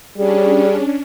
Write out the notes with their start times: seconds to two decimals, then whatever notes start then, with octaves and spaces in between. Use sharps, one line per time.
0.17 G3 C#4 D4 G#4